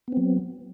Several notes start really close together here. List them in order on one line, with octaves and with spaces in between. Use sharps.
B3 C4 F#3